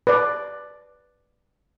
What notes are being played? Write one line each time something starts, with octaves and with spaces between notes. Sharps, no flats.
B4 D5